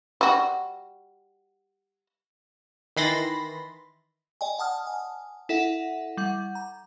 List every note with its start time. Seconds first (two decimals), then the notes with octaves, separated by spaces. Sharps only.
0.21 G3 F#4
2.97 D#3 E3 B5 C6 A6 A#6
4.41 D5 D#5 G5 G#5
4.59 F#5 A5 D#6 F6
4.87 G#5
5.49 E4 A4 E5 F#5
6.17 G3 F#5
6.55 A#5